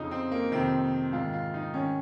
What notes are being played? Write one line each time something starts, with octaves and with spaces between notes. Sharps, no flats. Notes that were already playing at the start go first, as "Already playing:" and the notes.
Already playing: F2 C#3 D#4
C4
A#3
F2 C3 D#3 C4
G#2 D#3 F4
F4
D#4
G#2 D#3 C#4